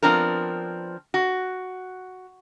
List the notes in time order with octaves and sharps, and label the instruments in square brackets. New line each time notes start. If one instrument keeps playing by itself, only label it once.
[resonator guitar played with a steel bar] F3 B3 C4 D4 A#4
F#4